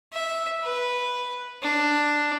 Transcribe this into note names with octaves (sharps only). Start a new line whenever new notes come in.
E5
B4
D4